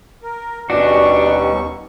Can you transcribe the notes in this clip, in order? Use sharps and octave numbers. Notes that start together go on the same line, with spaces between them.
A#4
D#2 B2 D#3 G3 C#4 D4 F#4 C#6